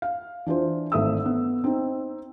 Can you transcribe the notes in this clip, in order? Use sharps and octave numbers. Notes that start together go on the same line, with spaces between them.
F5
E3 D4 F4 C5
G#1 A3 E5 D#6 E6
B3
C4 D#4